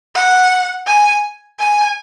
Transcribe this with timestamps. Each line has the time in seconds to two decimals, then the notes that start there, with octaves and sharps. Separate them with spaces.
0.15 F#5
0.87 G#5
1.59 G#5